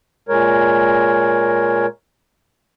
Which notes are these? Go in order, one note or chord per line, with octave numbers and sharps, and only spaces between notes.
A#2 G#3 A#4 C#5